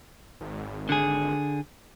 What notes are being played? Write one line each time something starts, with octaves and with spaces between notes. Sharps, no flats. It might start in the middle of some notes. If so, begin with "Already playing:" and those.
G#1
D3 G#4